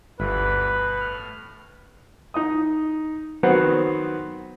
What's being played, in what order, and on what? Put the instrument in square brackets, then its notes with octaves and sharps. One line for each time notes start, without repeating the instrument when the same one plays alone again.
[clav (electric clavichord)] G1 [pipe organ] D2 E3 B5 [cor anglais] B4
[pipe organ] B2
A2 F6
[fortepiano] D#4 D#5 D#6
D#3 F#3 B3 C4 C5 F#5